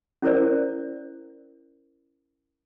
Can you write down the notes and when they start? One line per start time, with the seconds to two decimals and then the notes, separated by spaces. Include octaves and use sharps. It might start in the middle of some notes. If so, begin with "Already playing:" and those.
0.22 C#4 E4 A#4 C5 D5